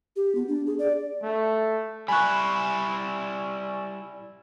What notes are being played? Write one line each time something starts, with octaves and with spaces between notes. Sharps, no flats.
G4
B3
D4
G#4
D5
A3
G3 E4 G#5 B5 C#6 F#6